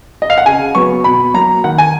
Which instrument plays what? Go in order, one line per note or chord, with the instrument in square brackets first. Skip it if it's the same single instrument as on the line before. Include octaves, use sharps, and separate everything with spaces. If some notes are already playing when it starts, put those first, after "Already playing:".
[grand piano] D#5
F5
F#5
C#3 G#5
F#3 B3 C#6
B2 B5
F#3 A#3 A#5
D#3 F#5
G#5